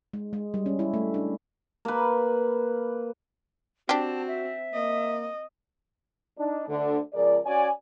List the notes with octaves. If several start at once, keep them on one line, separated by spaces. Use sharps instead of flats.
G#3
G#3
G3
C#4
E4
A3
D4
A#3 B4
C4 D4 F#4 G4 A5
E5
A#3 D#5
D4 D#4
D2 D3
C#2 F3 G#4 A#4 D5
C#4 F#4 C#5 D5 G#5